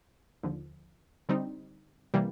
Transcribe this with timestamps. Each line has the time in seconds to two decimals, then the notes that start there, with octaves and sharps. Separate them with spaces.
0.43 D#2 D3 F3
1.29 D3 G3 C4 D#4
2.14 C3 E3 G3 A#3